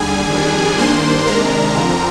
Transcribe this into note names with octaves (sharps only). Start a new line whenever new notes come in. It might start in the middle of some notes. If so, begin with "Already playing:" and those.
Already playing: D#2 D3 G3 G#4 G#5
F2 D#3 G3 D4
G2 D#3 A#3 D4 C5 C6
C3 D#3 G#3 D4 A#4 A#5
F2 D3 F3 C4